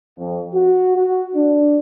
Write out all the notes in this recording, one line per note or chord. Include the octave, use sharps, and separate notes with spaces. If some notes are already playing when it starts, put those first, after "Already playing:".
F2
F#4
F#4
D4